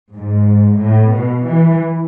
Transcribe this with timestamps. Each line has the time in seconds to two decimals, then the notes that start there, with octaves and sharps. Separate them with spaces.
0.15 G#2
0.80 A2
1.13 B2
1.46 E3